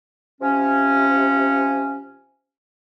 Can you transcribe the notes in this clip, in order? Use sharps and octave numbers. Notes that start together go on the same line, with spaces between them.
C3 F3 C#4